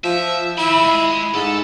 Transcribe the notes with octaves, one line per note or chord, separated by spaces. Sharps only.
F3 E5
E4 G#4 B5
G#3
G#2 A4